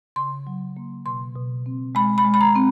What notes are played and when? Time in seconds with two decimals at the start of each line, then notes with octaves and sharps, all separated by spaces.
0.16 C#3 C6
0.47 F#3
0.77 A#3
1.06 B2 C6
1.36 B2
1.66 C4
1.95 G#3 B5
2.18 B5
2.25 G#3
2.34 B5
2.41 A#5
2.55 C4